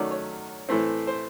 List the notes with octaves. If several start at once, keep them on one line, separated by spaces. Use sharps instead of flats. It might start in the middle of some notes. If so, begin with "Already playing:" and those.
Already playing: D#3 F#3 A3 C#4 D5
C#5
A2 E3 A3 C4
C5